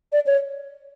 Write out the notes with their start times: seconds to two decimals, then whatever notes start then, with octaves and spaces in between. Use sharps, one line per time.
0.13 D5
0.26 C#5